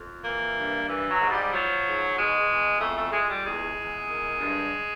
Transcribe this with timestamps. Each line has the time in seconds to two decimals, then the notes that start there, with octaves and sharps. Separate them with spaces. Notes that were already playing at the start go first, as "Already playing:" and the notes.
Already playing: F2
0.24 E3 A#3
0.56 G2
0.88 E3
1.10 F#3
1.20 G#2
1.30 G3
1.52 F3 F#3
1.84 G#2
2.16 B2 G#3
2.48 E2
2.81 F2 A3
2.96 A3
3.12 F2 G#3
3.28 G3
3.45 E2 G#3
3.76 E2
4.08 D#3
4.40 G2